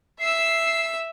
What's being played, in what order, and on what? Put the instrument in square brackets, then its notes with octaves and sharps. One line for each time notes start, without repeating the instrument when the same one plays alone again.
[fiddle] E5 E6 [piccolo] C7